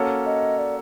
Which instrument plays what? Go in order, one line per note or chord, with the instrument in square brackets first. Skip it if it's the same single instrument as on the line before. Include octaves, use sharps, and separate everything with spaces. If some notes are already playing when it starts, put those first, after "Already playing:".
Already playing: [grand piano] A#3 C#4 F#4 A4 C#5
[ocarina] D#5
D5